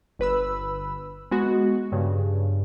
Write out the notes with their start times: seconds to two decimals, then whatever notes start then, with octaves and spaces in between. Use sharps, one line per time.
0.19 G1 B4 B5 E6
1.31 G#3 B3 F#4
1.92 G2 C#3